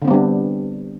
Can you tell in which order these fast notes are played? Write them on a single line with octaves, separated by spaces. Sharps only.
D3 C4 B3 G3 D4